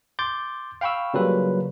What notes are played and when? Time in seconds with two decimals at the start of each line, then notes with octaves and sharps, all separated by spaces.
0.19 C6 D6 G6 A6
0.81 F5 G5 B5 C#6 E6
1.14 C#3 F#3 G3 A#3 F4 B4